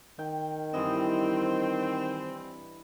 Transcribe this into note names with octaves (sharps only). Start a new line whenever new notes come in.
D#3 G5
G2 E3 C4 D#5